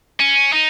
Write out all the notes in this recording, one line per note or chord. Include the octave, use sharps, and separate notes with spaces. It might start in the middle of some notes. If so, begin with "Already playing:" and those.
C#4
D#4